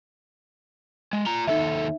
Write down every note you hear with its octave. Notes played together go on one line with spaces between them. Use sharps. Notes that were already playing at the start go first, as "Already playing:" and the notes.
G#3 G#5
F4 A#5
D#2 D#4 A4 E5